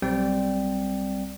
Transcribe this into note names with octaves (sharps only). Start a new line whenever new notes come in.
B1 G3 C4 D5 G5